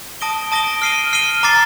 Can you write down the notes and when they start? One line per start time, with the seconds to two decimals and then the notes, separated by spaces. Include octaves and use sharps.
0.21 A5 D#6 A#6 D7 G7
0.52 A5 D#6 A#6 D7 G7
0.82 F6 C7 D#7 G7
1.13 F6 C7 D#7 G7
1.43 A#5 D6 A6 C7